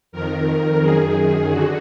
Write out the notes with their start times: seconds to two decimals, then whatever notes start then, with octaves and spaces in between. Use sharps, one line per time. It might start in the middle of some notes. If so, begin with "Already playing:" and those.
0.12 F2 D#3 A#4
0.81 F#2 D#3 G#4
1.15 G#4
1.50 D3 F#4